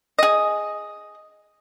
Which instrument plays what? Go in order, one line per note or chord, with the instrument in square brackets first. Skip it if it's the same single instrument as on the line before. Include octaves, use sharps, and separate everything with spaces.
[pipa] G#4 D#5